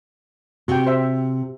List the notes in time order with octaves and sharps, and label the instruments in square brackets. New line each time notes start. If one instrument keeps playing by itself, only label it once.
[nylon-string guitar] C3 [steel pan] F#4 G4 G5
[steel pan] C5 E5